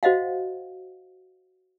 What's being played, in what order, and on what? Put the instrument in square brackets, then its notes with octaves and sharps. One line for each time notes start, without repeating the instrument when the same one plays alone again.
[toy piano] F#4 C5 D#5 F5 F#5